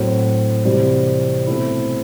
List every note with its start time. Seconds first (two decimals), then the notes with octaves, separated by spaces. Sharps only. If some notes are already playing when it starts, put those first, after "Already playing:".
Already playing: A2 F#3 C4
0.64 C3 E3 G3 C4 F#4
1.47 B2 A3 C4 E4